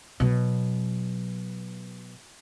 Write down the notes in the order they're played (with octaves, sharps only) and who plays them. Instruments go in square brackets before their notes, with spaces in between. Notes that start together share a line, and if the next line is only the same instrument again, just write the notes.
[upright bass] B2 F#3